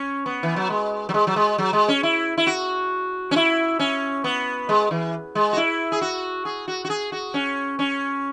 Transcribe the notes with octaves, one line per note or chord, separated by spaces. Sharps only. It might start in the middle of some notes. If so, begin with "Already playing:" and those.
Already playing: C#4
B3
E3
F#3
G#3
F#3
G#3
F#3
G#3
F#3
G#3
C#4
E4
E4
F#4
C#4
E4
C#4
B3
G#3
E3
G#3
F#4
E4
G#4
F#4
G#4
F#4
F#4
G#4
F#4
C#4
C#4